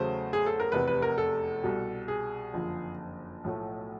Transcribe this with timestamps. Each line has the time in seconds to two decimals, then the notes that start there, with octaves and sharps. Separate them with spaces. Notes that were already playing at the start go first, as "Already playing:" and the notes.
Already playing: E2 C#3 F#3 A3 C5
0.33 G#4
0.46 A4
0.60 A#4
0.72 F1 E2 C3 B4
0.87 B4
1.02 A#4
1.18 A4
1.63 C2 B2 G3
2.08 G#4
2.53 F#1 F2 D3 F3
3.44 B1 A2 F3 A3